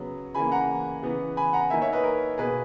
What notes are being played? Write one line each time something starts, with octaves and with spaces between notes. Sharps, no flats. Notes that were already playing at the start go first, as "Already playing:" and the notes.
Already playing: C#3 F#3 B3
C#3 E3 A#3 G#5 B5
F#5 A#5
C#3 E3 B3
G#5 B5
F#5 A#5
D#3 A#3 E5 G#5
C#5 E5
B4 D#5
A#4
B2 A#3 G#4 B4